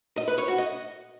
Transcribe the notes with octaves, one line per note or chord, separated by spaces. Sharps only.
D#5
B4
C#5
F#4
D#5